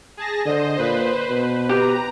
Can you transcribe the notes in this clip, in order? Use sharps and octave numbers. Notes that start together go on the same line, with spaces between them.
G#4 A5 A#6
D3 C5 D#5
A#2 B4
B2
G4 A#5